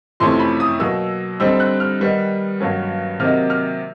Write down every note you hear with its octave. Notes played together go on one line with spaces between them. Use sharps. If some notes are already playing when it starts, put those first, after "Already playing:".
F2 C3 E3 A3 C#4 C6
B5
D#6
B2 F#3 A#3 E6
D3 G3 C4 D#4 E6
F#6
F6
D#3 G3 B3 D#4
G2 D#3 F#3 A#3 C#4
C3 D#3 F#3 A#3 D#4 F6
F6